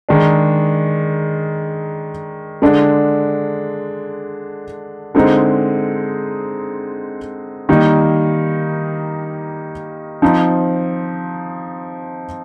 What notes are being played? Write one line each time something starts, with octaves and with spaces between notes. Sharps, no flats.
D#3 G#3 D4
D3 G#3 D4
D3 G#3 C4 D#4
D#3 G3 A#3 D#4
F3 C4 D#4